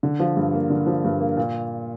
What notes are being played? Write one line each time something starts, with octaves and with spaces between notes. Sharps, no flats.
D3
F3
G2
A#3
D3
F3
G2
A#3
A#2